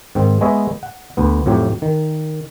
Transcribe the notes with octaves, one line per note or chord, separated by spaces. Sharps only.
G#2 D#3 C4
G#3 B3 C#5 D#5 E5
F#5
D2 B3
F2 A2 F#3 G4
D#3